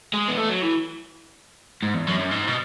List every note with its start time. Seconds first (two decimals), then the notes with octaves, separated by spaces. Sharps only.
0.14 G#3
0.29 B3
0.38 A3
0.50 F#3
0.62 E3
1.82 G#2
1.94 E2
2.07 F#2
2.19 F#2
2.31 G#2
2.47 B2